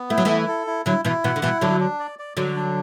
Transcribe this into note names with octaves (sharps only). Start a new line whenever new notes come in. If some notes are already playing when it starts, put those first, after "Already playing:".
Already playing: B3
A3 E4
F#3
E3 A3 E4
A4
E4
D3 F#3 E4
B2 E3 E4
B2 E3 F#5
D3
B2 E3 E4
D3 F#3 D4
D4
D5
D5
D3 F#3 D5
D4